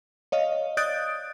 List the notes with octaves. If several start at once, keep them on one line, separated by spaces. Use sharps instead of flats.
C#5 D#5 F5
D5 D#6 F#6 G6 A6 D7